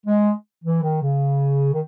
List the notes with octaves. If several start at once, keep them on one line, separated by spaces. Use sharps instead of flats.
G#3
E3
D#3
C#3
D#3